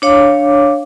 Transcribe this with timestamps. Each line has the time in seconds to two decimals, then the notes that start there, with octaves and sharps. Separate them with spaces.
0.02 D4 C#5 F5 D6